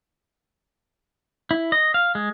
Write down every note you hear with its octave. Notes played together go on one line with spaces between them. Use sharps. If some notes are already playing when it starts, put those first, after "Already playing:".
E4
D#5
F5
G#3